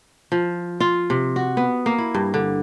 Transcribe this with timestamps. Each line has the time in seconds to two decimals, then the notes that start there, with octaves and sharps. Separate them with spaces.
0.32 F3
0.80 F4
1.10 C3
1.36 F#4
1.57 B3
1.86 A#3
1.98 E4
2.15 G2
2.34 D3